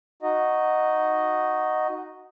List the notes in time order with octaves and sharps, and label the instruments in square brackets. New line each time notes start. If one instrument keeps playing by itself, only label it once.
[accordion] D#4 F#4 D#5